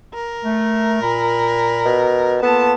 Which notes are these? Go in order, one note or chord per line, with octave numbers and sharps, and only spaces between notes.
A#4
A3
A#2 B5
B2
A#3 B3 F4 A4 A5